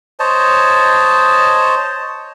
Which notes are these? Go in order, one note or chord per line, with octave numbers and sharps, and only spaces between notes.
C5 C#5 D#5 A5